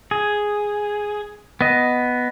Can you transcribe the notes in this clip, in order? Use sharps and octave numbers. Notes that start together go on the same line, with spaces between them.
G#4
B3 D#5